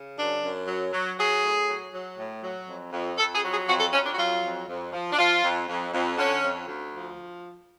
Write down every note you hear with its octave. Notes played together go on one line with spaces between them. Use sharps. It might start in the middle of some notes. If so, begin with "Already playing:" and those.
Already playing: C#3
F#2 D4
F#2
F#3
F#3
F#3 G#4
A2
F#3
F#3
A2
F#3
F2
F2
F2 A4
G#4
F#3
G#4
F2 F#4
A4
F2 C#4
D4
F#4
F#3 F4
F2
F2
F3
D4
F3 F4
F2
F2
F2
D3 C#4
F2
D2
F3